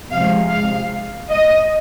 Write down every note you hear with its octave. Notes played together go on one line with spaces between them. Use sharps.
C3 F3 G#3 F5
F5
D#5